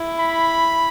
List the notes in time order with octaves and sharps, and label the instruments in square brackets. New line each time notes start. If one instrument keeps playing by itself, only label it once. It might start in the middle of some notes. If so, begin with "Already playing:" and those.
Already playing: [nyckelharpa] E4
[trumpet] B5